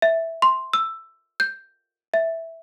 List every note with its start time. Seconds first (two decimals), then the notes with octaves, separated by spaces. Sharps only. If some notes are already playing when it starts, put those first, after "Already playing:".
0.02 E5
0.42 C6
0.73 E6
1.40 G6
2.14 E5